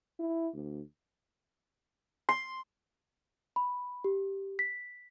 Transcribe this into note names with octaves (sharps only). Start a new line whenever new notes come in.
E4
D2
C6
B5
G4
B6